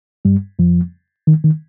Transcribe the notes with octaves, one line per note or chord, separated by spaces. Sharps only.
G2 G3
F2 F3
D#3
D#3